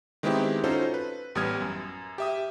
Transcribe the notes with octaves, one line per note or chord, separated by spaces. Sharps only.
D#3 G#3 B3 C4 E4 G4
C#4 D#4 F4 F#4 A4 C5
B4
A1 G3 B3 D#6 F6 G#6
F#2
G4 E5 D#6